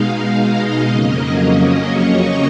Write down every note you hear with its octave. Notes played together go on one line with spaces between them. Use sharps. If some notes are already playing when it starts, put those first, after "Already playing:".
Already playing: B2 G#3 D#4 F5
D#5
F2 C#3 F#3 A#3 C#4 D#5
C#6